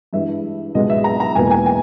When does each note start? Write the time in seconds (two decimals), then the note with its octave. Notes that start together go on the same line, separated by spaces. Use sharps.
0.13 G2 E3 G#3 E5
0.75 C#2 B2 G#3 B3 D#5
0.90 E5
1.04 A#5
1.20 A#5
1.35 E1 E2 B2 A#3 G#5
1.51 G#5
1.66 G#5